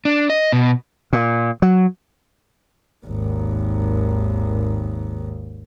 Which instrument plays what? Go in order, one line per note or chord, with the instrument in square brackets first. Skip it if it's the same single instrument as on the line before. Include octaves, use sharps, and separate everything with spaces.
[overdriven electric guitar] D4
D#5
B2
[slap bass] A#2
F#3
[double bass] G#1 D#2